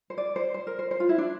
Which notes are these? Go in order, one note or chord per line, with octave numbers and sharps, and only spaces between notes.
C5
D5
C5
C5
A#4
C5
C5
F4
E4
D4